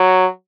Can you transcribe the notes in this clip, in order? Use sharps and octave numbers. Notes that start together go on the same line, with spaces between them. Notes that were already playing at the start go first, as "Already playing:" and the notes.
Already playing: F#3